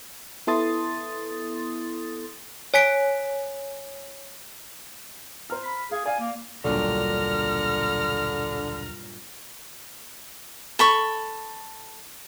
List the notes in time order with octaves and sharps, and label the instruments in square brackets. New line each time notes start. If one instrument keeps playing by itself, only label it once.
[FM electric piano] B3 E4 A4 C6 D#6 A6
[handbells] C#5 G#5 B6 D7
[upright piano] C5 A#5 F6
[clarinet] B5
[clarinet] G#4 [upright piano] F5
[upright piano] D5 F5 [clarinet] G#5
[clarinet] A#3
[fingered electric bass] D#1 B1 [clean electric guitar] G2 A#2 F#3 [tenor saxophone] D3 [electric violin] A#5 F6
[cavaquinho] A4 B5 C#6